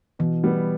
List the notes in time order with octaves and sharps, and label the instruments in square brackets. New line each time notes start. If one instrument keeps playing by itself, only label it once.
[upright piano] B2 [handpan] E3
[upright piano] G3 B3